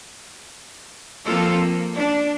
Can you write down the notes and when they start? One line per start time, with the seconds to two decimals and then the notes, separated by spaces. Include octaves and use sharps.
1.27 F3 A#3 C4 F4 A4
1.59 A#3
1.96 D4